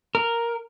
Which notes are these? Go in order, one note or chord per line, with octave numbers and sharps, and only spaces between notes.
A#4